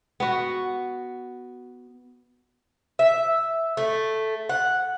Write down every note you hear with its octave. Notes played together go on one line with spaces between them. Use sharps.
B3 F#4
E5
A3
F#5